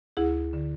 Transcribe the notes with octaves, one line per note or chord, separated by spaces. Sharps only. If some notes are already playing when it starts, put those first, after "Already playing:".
D2 E4 G#4
D3